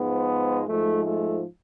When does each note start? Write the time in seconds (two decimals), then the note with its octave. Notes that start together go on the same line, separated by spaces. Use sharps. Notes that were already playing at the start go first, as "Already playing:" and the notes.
Already playing: G#2 F3 G#3 B3
0.67 G#2 F3 G#3 A3
1.05 A3